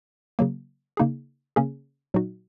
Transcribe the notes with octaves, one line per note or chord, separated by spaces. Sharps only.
C#3 F#3 A#3
C#3 A#3 D#4 G#4
C#3 A#3 C#4 G#4
A#2 F#3 D#4 F#4